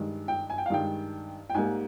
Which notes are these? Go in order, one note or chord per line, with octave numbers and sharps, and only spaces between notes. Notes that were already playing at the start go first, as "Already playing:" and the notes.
Already playing: G2 D#3 G#3
G5
G#5
G5
F5
G2 D#3 G#3 G5
G5
G#2 G3 A#3 G#5